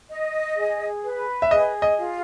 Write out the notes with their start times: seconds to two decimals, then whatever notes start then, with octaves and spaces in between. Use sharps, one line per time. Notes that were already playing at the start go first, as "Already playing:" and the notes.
0.09 D#5
0.56 G#4
1.03 B4
1.42 E5
1.51 G#4 D#5
1.82 D#5
1.98 F4